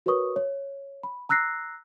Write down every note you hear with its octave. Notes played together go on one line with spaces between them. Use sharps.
F#4 A#4 B4 C#5 C#6 D#6
C#5
B5
A#5 E6 F#6 A#6 C7